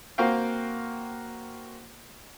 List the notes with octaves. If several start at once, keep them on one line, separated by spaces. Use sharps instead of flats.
A#3 C4 F#4 F5 G5